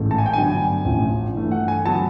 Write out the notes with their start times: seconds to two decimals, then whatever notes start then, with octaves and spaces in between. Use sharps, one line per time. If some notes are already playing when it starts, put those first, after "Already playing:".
Already playing: A1 G#2 E3 A3
0.11 A5
0.18 G#5
0.26 G5
0.33 G2 D3 F#3 B3 G#5
0.85 A1 A2 F3
1.35 G2 E3 A3
1.51 F#5
1.68 G#5
1.85 D3 F#3 B3 A5